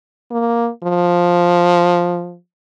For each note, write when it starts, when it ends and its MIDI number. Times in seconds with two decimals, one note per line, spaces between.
0.31 0.69 58
0.83 2.36 53